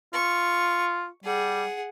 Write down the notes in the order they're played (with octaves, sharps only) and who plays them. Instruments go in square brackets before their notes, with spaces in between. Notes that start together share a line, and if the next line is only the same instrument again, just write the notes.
[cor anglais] F4 [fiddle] C#6
[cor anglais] G3 [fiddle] G#4 F#5